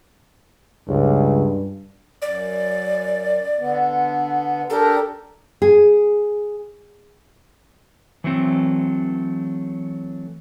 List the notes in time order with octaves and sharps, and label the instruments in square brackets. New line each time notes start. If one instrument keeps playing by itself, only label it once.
[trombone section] C#2 [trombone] G2
[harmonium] F#2 [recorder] D5
[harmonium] D3 B3
[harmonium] D4 G4 A#4 [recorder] A4
[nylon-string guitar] G#4
[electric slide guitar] E3 F#3 A3 C4